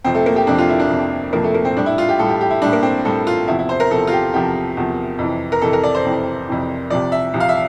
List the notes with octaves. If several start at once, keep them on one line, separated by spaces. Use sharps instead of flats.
F2 C3 F3 C4
A3
A#3
G4
F2 C3 F3 D4
F4
E4
D4
F2 C3 F3
F2 C3 F3 A#3
A3
A#3
C4
A2 G3 D4
E4
F4
G4
A2 G3 A4
G4
G4
E4
A2 G3 D4
A#3
C4
A2 G3 A4
F4
E2 C3 F3 E4
E4
C5
A#4
E2 C3 F3 A4
F4
G4
E2 C3 F3 G4
E2 C3 F3
F2 C3 E3
A#4
F2 C3 E3 A4
A#4
D5
C5
F2 C3 E3
F2 C3 E3
C2 C3 F3 D5
E5
C2 C3 F3
F5
E5